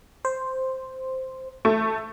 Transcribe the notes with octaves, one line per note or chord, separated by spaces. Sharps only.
C5
A3